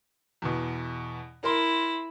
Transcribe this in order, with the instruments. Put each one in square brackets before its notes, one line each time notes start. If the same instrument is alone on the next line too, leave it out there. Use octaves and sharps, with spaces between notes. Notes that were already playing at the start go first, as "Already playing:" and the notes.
[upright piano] E2 B2
[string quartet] E4 [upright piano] A#4 C6